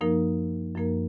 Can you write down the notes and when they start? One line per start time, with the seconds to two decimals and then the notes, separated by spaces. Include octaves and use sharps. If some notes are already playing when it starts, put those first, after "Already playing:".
0.01 F#2 F3 A#3 D#4 A#4
0.75 F#2 F3 A#3 D#4 A#4